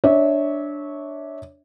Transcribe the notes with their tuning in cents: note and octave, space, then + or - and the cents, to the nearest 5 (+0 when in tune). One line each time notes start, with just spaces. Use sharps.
D4 -5 C#5 +0 E5 -25